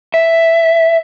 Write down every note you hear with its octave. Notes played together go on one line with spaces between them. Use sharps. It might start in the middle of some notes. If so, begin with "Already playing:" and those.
E5